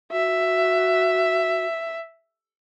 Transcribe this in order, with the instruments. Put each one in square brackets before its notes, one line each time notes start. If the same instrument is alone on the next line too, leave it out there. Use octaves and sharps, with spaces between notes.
[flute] F#4 [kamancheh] E5